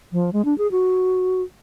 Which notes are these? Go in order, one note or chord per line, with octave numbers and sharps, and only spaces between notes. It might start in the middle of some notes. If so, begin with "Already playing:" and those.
F3
G#3
D4
G#4
F#4